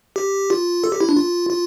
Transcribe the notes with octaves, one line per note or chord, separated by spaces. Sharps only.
G4
F4
A4
G4
E4
D4
F4
F4